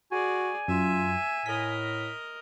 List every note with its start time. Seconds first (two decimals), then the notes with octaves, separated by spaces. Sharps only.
0.12 F#4 G#4 D5 G#5
0.68 F#2 F4 E5
1.46 A2 A#4 D#5 B6